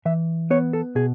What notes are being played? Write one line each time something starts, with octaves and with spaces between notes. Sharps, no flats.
E3 E5
B3 C#5
A4
B2 G#4